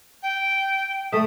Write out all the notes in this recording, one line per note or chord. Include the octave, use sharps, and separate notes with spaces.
G5
A3 E5 D#6